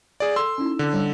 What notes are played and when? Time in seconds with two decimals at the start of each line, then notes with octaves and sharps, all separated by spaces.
0.20 G#4 D5
0.36 A4 C6 E6
0.58 C#4 D#4 E4
0.79 D3
0.93 G3 C#5